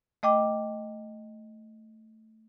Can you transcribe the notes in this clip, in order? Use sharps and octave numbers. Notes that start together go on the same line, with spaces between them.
A3 D#5 G5 D6